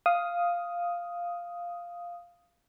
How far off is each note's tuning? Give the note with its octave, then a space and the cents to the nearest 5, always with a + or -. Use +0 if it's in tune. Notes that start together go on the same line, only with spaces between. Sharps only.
F5 +0 D#6 +5